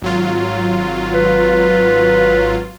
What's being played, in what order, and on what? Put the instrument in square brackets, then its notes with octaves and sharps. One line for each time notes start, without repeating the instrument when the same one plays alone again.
[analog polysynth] G#1 F#3 F4
[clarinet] B4